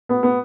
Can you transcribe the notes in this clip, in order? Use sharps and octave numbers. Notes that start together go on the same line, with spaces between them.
B3
B3